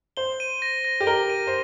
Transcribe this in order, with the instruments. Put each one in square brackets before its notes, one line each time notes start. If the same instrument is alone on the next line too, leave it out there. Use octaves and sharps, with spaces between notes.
[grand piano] C5 [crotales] G7
[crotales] D#7
A#6
A#6
[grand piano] G4
[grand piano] A#4 [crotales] G7
[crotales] D#7
[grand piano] C5